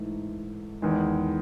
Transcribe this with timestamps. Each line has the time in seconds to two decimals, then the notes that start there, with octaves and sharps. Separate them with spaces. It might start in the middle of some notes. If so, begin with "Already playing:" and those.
Already playing: G#2 E3 A3 D#4
0.82 E2 D#3 G#3